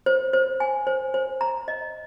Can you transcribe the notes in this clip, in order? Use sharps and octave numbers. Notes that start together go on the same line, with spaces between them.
C5
C5
G#5
C5
C5
A#5
D#5